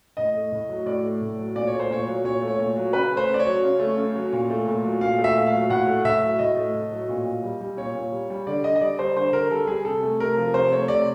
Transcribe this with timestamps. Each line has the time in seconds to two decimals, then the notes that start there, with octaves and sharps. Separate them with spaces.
0.17 A2 D#5
0.34 A3
0.52 A2
0.69 F#3
0.86 A2 D5
1.04 A3
1.21 A2
1.38 F#3
1.55 A#2 D5
1.67 C#5
1.73 A3
1.80 C5
1.90 A#2 C#5
2.07 F#3
2.24 A#2 C#5
2.41 A3
2.48 C#5
2.59 A#2
2.76 F#3
2.93 C#3 B4
3.12 A3
3.17 C5
3.28 C#3
3.34 D5
3.40 C#5
3.46 F#3
3.63 C#3
3.80 A3
3.97 C#3
4.15 F#3
4.33 A#2
4.50 A3
4.67 A#2
4.83 F#3
5.01 A#2 F5
5.19 A3
5.24 E5
5.35 A#2
5.47 F5
5.54 F#3
5.70 A2 F#5
5.87 A3
6.05 A2 E5
6.22 F#3
6.39 A2 D#5
6.56 A3
6.74 A2
6.92 F#3
7.09 A#2
7.25 A#2
7.44 G3
7.61 G3
7.77 A#2 C#5
7.95 A#2
8.12 G3
8.30 G3
8.47 D3 D5
8.64 D3 D#5
8.76 D#5
8.81 G3 D5
8.99 G3 C5
9.16 D3 C5
9.33 D3 A#4
9.50 G3 A4
9.67 G3 G#4
9.85 C3 A4
10.03 A3
10.20 C3 A#4
10.37 F3
10.54 C3 C5
10.71 A3 C#5
10.88 C3 D5